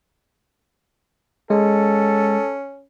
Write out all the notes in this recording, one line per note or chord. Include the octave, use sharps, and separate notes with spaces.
G#3 C#4 A4